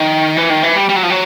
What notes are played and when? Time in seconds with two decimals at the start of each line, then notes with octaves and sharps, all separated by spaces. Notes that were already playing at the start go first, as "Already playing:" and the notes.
Already playing: D#3
0.37 E3
0.50 D#3
0.63 E3
0.76 G3
0.89 G3
0.96 F#3
1.03 F3
1.10 F#3